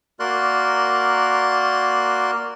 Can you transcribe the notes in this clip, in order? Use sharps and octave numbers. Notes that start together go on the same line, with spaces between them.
A#3 F#4 A#4 D5 C6 F#6